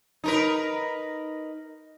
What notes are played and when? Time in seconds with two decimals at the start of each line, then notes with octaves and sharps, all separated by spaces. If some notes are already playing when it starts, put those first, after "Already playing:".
0.24 D#4 A#4 B4